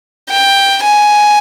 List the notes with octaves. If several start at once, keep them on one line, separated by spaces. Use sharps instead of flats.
G5
G#5